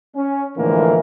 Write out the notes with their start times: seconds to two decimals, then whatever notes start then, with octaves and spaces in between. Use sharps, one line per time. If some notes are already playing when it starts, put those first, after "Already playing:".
0.16 C#4
0.57 A2 D3 E3 F3 G#3 A#3